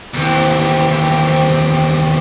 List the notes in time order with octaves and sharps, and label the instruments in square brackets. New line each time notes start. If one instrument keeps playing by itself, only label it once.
[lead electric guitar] D#2 E3 [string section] C4 G4